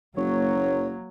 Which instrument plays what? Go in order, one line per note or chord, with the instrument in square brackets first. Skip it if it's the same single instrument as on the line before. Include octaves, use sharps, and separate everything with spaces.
[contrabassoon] F#1 [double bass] F#3 A#3 [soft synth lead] C#5